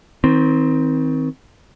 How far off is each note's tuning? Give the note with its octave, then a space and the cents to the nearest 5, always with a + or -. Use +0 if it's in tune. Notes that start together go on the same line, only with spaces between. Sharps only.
D#3 +35 C4 +0